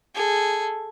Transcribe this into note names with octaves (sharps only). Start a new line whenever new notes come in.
G#4 A4